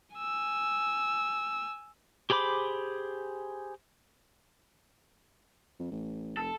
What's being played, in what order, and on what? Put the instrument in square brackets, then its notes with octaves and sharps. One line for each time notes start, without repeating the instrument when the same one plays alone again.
[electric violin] G#5 E6
[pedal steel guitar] G4 G#4 C5 B5 D6
[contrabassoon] F2
A1
[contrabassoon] F1 [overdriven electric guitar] A4